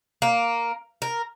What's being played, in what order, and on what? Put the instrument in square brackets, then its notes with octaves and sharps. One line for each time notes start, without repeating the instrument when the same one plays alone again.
[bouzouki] A#3
A#4